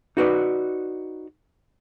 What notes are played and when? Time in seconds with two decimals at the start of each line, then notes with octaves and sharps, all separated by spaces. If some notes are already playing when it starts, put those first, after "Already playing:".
0.17 D#4 F#4 B4 D5